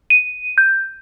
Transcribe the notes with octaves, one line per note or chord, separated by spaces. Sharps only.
D#7
G6